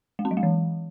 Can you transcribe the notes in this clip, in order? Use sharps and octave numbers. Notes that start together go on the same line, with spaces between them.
G#3
C4
F#3
G#3
E3